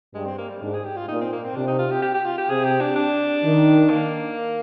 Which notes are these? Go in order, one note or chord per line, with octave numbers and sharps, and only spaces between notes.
G2 G#3
C4
A#3
G3
G#2 D4
G#4
G4
F4
A#2 D#4
C4
A#3
C4
C3 D4
D#4
F4
G4
G4
G4
F4
G4
C3 G#4
G4
D4
D4
D#3
A#3